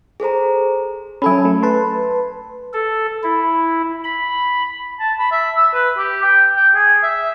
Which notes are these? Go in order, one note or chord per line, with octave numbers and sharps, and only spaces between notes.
G#4 A4 C5 A#5
F#3 C#4 A4 G#5 B5
A3
B4 A5 C6
A4
E4
B5
A5
B5
E5
E6
B4
G4
G5
G5
G#4
E5